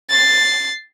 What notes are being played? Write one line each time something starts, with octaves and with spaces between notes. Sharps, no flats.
A6 C7